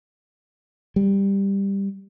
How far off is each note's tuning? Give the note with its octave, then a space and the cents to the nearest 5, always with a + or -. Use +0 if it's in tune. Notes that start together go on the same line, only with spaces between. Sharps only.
G3 +10